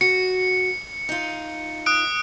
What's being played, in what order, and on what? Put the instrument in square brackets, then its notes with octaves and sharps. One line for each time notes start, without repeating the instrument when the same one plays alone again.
[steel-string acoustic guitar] F#4 [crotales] C#7
[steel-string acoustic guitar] D#4 F4
[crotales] D#6 F#6 D7